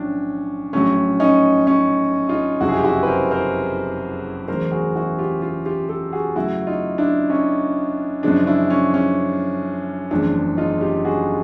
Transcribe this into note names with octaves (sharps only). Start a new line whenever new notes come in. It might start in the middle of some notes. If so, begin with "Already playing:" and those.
Already playing: B1 A2 F3 C#4 D4
A#1 A2 F#3 A3 C#4
C#4 D#4
C#4 D#4
D#4 F4
F#1 F2 C3 F3 G#3 E4 F#4
G#4
G4
E4 F#4
B4
A#4 C5
A#4 C5
E1 E2 C#3 F#3 A3 A#4 C5
F#4 G#4
E4 F#4
F4 G4
F4 G4
F4 G4
G4 A4
F#4 G#4
F#2 C#3 F#3 A3 E4 F#4
D#4 F4
D4 E4
C#4 D#4
F#2 C#3 F3 G#3 D4
D4 E4
C#4
C#4
F#1 E2 C#3 F3 A3 D4
D#4 F4
F4 G4
F#4 G#4